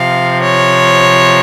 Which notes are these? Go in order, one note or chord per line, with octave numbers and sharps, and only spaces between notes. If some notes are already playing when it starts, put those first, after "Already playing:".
Already playing: C3 F3 F5
C#5